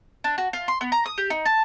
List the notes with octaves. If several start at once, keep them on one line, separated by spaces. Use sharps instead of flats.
D4
F#4
F4
C6
B3
A#5
D#6
G4
D#4
A5